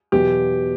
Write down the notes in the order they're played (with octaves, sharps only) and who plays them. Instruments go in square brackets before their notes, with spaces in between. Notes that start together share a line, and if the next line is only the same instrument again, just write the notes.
[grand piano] E2 B2 F#3 G4